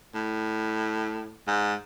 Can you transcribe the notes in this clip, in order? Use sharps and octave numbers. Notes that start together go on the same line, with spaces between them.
A2
G#2